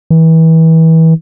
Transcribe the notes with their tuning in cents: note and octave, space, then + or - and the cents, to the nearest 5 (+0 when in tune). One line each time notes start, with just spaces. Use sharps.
E3 -30